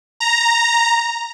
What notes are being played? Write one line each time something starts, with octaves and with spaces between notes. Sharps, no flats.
A#5